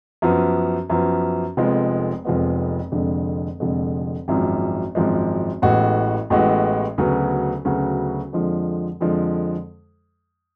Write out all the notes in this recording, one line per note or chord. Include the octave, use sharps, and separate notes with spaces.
F#2 F3 B3
F#2 F3 B3
F1 F2 F3 G#3 B3
F1 F2 F3 G#3 B3
F1 F2 D3 G#3
F1 F2 D3 G#3
G#1 F#2 F3 G#3
G#1 F#2 F3 G#3
A1 A2 G#3 B3 F#4
A1 A2 G#3 B3 F#4
D2 C#3 F#3 B3 F#4
D2 C#3 F#3 B3 F#4
F2 D3 F3 G#3
F2 D3 F3 G#3